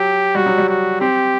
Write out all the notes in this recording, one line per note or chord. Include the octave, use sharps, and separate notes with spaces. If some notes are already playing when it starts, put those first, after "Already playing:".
Already playing: F#3 G4
G3 F#4
F#3
G3
F#4
C4 G4